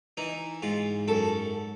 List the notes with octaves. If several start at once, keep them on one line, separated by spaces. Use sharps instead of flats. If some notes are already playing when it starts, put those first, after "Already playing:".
E3 D#4
G#2 F4
F#2 A4